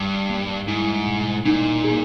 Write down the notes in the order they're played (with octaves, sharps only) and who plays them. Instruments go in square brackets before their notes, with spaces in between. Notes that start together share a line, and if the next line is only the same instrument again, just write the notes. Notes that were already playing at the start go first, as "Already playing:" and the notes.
Already playing: [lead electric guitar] G2 [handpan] G3
[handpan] A#3
[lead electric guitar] G#2 [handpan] E4
[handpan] B2
[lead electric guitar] A#2 [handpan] D#4
[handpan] G#4